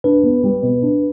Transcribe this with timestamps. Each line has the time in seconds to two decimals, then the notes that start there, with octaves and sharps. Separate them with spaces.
0.04 D4 B4
0.23 B3
0.44 G3
0.62 B2
0.82 D4